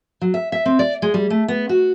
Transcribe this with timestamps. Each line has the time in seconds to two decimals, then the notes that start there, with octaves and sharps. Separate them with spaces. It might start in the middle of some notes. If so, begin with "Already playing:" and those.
0.21 F#3
0.34 E5
0.52 E5
0.66 C4
0.79 D5
1.02 G#3
1.14 G3
1.30 A3
1.48 B3
1.69 F#4